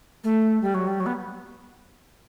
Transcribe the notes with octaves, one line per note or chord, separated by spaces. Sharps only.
A3
G3
F#3
G3
F#3
B3